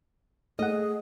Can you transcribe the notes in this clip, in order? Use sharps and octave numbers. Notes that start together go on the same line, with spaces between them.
A3 G#4 D#5 F#5